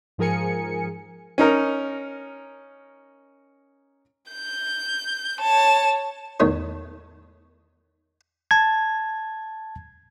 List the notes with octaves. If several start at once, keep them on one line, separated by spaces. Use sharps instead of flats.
G#2 F3 G#4 A#4 G#5 C#7
C#4 D#4 A#4
G6
C#5 A5
E2 A2 D#3 A3 D#4 C#5
A5 G#6